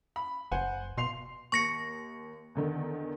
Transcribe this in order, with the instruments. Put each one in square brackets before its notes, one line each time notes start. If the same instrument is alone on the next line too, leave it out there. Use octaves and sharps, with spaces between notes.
[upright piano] B5
[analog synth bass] F#1 [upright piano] C5 F#5 G#5
[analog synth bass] B2 [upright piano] C6 C7 F7
[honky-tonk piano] D#2 [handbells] C#6 A#6 C#7
[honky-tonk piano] E2 D3 D#3